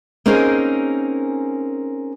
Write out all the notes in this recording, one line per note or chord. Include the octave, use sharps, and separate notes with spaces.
A#3 C4 C#4 D#4 G#4 A#4